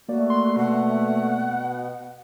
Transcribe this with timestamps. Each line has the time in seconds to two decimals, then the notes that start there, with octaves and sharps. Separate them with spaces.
0.09 A3 A#3 F#4 D5
0.30 C6
0.56 B2 F#5